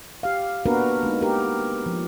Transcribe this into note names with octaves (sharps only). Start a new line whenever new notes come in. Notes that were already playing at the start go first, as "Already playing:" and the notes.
G4 F5
A#3 B3 D4 F#4 A#4 B4
G#3 B3 D#4
G4 A#4
F3